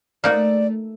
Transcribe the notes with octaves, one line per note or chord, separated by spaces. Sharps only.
A3 A#3 D#4 F#4 D5